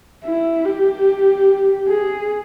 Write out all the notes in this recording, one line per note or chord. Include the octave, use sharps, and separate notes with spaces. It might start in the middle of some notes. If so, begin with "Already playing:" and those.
E4
G4
G#4